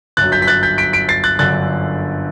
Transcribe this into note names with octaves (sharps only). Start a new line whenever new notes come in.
G1 F#2 F#3 F#6 A6
G6 B6
B6
F#6 A6
G6 B6
B6 D7
B6 D7
A6 C7
F#6 A6
G1 F#2 D3 F#6 A6